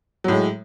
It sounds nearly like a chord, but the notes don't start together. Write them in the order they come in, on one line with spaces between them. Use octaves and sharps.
F#3 A2 G#3